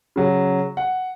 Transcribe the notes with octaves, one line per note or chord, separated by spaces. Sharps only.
C#3 F#3
F#5